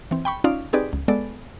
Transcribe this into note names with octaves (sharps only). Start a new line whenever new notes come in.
E3 C4
G5 B5 C#6
C#4 D#4 F4 D5 F5
C4 D#4 G4 G#4 B4 D5
C#2
G#3 B3 A4 D5